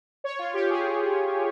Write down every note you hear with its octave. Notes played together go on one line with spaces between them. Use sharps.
C#5
F4
G4
G#4